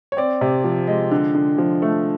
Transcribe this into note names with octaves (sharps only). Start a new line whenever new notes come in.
C#5
C4 D5
C3
F3
G#3
D3
D3
F3
A3